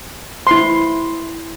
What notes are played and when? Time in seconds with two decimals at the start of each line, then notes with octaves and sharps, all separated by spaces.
0.47 E4 C6